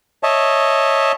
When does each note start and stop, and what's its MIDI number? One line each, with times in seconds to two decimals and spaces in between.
0.23 1.12 73
0.23 1.12 75
0.23 1.12 76
0.23 1.12 81